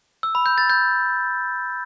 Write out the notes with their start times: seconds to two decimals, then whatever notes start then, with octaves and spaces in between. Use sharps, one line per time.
0.23 E6
0.35 B5
0.46 G6
0.58 A6
0.70 G6